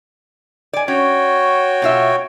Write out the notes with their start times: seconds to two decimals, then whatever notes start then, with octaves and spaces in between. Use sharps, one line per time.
0.73 D5 G#5
0.88 C#4 F#4 C#5 G5
1.82 B2 F4 E5